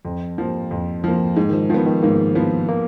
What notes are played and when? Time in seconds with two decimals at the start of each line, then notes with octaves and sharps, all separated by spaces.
0.05 F2
0.38 F3 A#3
0.71 F2
1.04 F3 A#3
1.36 G#2 G#3
1.49 D#3
1.53 F3
1.70 D#3 F3 B3
1.86 D#3
2.03 G#2 A#3
2.35 F3 B3
2.68 A#3